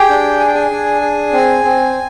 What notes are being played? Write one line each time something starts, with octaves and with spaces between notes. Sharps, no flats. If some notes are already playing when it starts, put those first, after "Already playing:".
Already playing: G4 G#4 G5
D4
G#4 G#5
G5
G#4 G#5
D4
G#4
C4
C4